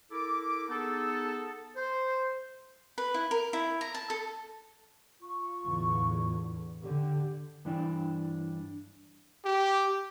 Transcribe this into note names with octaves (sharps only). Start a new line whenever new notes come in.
E4 A4 A#4 D6
B3 D#4 G#4 A4
C5
B4
E4
A#4
E4
A#5
A5
A4
F4 C#6
E2 A2 D3
D3 G4
G2 E3 D4
G4